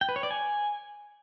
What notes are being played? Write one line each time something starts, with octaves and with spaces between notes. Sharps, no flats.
G5
B4
C#5
D5
G#5